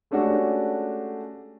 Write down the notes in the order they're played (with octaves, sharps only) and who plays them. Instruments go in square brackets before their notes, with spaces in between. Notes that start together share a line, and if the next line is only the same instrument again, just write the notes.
[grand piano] G#3 A3 C#4 D4 F#4 G4